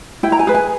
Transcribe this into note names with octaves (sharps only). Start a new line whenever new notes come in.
E4 G5
A#5
G#5
G#4 B4
G#5